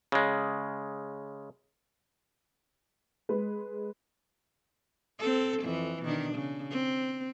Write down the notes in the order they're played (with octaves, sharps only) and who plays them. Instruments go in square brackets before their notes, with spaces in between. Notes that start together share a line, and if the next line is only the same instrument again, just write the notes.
[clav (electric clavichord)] C#3 G#3
[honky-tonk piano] G#3 B4
[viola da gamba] C4 A4
F2 E3
B2 D#3 D4
C#3
C4